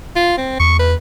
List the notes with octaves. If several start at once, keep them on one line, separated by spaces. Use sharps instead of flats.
F4
C4
E2 C#6
B4